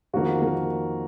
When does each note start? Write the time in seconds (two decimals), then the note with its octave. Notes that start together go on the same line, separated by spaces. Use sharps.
0.13 F2 D#3 A#3 F#4
0.42 D#3 A#3